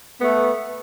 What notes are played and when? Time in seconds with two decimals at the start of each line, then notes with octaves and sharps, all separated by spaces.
0.21 A3 B3